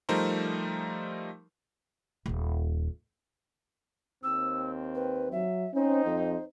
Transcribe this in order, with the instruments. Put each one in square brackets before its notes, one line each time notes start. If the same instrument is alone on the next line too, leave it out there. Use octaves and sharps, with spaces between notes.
[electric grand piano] F3 G3 A3 D#4 A#4 C5
[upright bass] D#1 D#2
[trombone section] D#2 C4 [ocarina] E6
[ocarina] B4
[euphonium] F#3 [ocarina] E5
[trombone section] C4 D#4 [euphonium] C#4 [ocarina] C5
[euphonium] F2